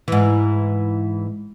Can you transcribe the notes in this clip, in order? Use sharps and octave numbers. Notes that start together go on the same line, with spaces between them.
G#2 E3